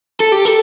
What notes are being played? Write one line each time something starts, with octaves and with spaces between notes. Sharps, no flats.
A4
G4
A4